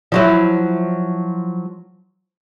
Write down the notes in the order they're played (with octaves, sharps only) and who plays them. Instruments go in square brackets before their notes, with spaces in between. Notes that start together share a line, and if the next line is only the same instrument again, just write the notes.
[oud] F3 F#3 E4